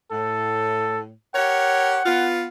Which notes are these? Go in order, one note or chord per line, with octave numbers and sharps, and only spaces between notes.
A2 A4
G4 A#4 C#5 F#5
B3 F4